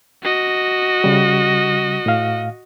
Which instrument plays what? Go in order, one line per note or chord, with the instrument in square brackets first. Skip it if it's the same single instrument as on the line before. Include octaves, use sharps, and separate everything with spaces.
[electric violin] F#4 D#5
[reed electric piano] C#3 G3
A2 F5